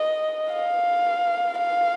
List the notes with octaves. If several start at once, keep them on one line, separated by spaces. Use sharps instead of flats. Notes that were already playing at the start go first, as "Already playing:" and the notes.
Already playing: D#5
F5
F5